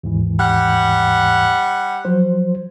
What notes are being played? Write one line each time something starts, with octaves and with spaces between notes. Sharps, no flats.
D#2 G#2 E3
G3 F#5
F3 F#3 C5